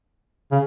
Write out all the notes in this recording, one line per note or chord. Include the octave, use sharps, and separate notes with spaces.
C#3